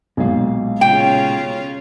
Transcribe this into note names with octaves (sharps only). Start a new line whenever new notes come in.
B1 A#2 G#3 F5
C#3 C#4 F4 G5